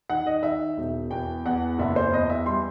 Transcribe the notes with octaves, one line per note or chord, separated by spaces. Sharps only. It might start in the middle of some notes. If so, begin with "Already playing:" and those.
D#3 F#5
D#5
D#3 E5
E1
E2 G5
E2 F#5
F#1 E5
C5
E2 D#5
E5
G3 C6